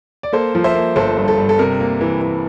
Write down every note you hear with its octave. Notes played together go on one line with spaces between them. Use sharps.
D5
A#3 A4 C5
F3
C5 E5
A#3
G1 A4 C5
G2
A4
G2
A4
C3 A#4
A#3
E3
E3